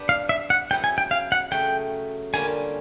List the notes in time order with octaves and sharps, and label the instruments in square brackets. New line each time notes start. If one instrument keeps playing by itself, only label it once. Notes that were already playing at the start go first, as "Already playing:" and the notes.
Already playing: [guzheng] B3 D4 G4
[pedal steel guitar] F5
E5
F#5
[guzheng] C#3 F#3 B3 E4 [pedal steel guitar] G5
[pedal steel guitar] G#5
G5
F5
F#5
[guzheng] C#3 F#3 A3 [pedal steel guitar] G5
[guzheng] D3 G3 A#3 C#4 F4 [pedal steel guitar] G#5